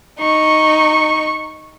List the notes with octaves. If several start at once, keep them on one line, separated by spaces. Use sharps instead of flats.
D#4 C#6